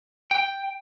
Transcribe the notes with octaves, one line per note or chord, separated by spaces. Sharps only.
G5